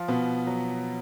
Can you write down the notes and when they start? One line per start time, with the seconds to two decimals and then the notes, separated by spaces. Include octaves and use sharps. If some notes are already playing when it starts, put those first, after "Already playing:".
Already playing: F3 F4
0.08 B2 B3
0.47 F#3